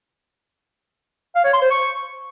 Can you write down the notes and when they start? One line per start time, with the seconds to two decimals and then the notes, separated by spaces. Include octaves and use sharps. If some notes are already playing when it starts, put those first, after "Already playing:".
1.35 F5
1.44 C#5
1.53 C6
1.62 C5
1.71 C#6